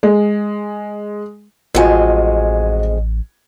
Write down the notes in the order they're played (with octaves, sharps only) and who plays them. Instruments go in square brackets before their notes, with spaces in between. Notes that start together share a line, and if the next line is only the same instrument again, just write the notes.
[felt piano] G#3
[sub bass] A1 [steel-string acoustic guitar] F2 G#3 [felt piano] F4 F#4 G#5